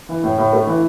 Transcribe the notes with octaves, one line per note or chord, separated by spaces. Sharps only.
E3
A2
A2
A3
E3